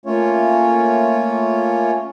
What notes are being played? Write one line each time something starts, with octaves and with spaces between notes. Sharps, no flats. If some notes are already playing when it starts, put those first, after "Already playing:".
A3 A#3 C#4 F4 C#5